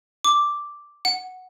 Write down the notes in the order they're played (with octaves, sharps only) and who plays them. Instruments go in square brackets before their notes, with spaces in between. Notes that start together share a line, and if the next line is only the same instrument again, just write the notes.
[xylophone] D6
F#5